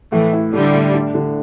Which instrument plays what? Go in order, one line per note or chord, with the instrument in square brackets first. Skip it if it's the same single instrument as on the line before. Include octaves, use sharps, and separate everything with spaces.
[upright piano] A2 [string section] E3 A3
[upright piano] E4
[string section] D3 G3 [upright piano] A3
[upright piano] A2
D4
D3